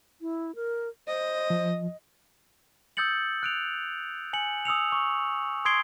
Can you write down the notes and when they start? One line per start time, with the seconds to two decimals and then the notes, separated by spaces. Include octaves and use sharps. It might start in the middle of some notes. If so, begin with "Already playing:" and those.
0.21 E4
0.55 A#4
1.08 C5 D#5
1.50 F3
2.97 D#6 E6 G6 A6 C#7 F#7
3.43 F#6 D7 F7
4.33 G#5 C#7 F#7
4.65 D#6 E6 C#7 F7
4.92 C#6
5.65 C6 D#6 G#6 C7 D7 G7